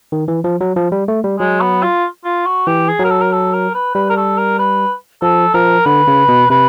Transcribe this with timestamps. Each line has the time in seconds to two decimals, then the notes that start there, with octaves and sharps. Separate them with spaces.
0.12 D#3
0.28 E3
0.44 F3
0.61 F#3
0.76 F3
0.92 G3
1.08 A3
1.24 G3
1.40 F#3 G#3
1.61 B3
1.82 F4
2.25 F4
2.46 F#4
2.67 E3 G4
2.88 G#4
2.99 F#3 A#4
3.10 A4
3.21 A#4
3.32 A4
3.53 A#4
3.74 B4
3.95 G3 B4
4.10 A#4
4.16 A4
4.37 A#4
4.59 B4
5.22 F3 A4
5.54 F3 A#4
5.86 D3 B4
6.08 C#3
6.29 B2
6.50 C3 B4